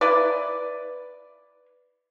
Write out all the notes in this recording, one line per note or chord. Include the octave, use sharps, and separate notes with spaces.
E4 B4 D5